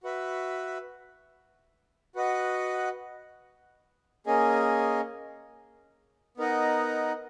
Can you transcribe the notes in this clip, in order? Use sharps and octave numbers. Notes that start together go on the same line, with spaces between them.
F#4 B4 E5
F#4 B4 D#5 F#5
A#3 C#4 G#4 D#5
B3 D#4 A#4 D#5 F#5